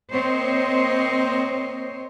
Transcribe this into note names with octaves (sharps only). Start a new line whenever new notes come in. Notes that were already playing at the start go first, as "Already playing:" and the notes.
A#3 C4 C5 C#5 D#5